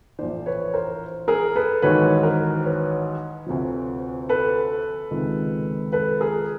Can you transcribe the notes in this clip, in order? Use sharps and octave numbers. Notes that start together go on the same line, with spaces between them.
A#1 A2 E3 C5 D5
B4 C#5
A#4 C5
G#4 A#4
A4 B4
A1 G#2 D#3 F#3 B4 C#5
A#4 C5
B4 C#5
D2 C3 F3
A4 B4
C#2 C3 D#3 G#3
A4 B4
G#4 A#4